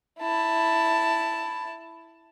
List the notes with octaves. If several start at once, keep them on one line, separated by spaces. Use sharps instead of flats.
E4 A5